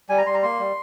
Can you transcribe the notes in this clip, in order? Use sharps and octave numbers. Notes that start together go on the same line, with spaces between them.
G3 G#5
A#5
G3 C6
A#5
A#3 C6
G3